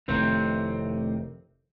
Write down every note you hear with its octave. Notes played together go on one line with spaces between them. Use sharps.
F1 A2 C3 D#3 C4